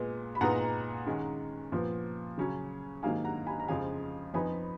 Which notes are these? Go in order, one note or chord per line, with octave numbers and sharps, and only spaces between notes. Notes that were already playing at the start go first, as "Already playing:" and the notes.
Already playing: A#2 G#3 B3
B5
A#2 G#3 B3 D#4 F#5 A#5
D#3 G#3 C#4
A#2 F3 B3
C#3 F#3 C#4
G#2 D#3 F#3 A#3 D#4 F5 G#5
F#5 A#5
G#5 B5
A#5
F2 C#3 F3 G#3 F5 G#5
F2 F3 B3 D#4 G#5 B5